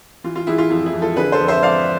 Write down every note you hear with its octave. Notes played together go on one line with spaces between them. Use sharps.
E3 F4
F4
E3 E4 G#4
F4
F2 F4
E4 G#4
F2
F4 A4
D3 G#4 B4
A4 C5
F2
C5 E5
F2 D5 F5